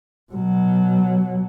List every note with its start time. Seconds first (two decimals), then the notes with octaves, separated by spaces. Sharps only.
0.33 B2 F#3